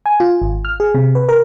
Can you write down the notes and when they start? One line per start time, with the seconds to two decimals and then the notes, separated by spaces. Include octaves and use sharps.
0.06 G#5
0.20 F4
0.42 G#1
0.65 F6
0.80 G#4
0.94 C3
1.15 B4
1.29 A#4